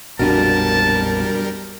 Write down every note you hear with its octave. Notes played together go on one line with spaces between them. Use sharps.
A#1 F2 B2 G3 D4 F#4 A#4 A5